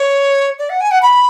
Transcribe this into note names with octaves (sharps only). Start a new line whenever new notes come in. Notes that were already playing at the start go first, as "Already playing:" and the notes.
Already playing: C#5
D5
F#5
G#5
F#5
B5